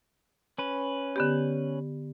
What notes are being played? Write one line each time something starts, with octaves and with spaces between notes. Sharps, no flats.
C#4 B4
D3 B3 G4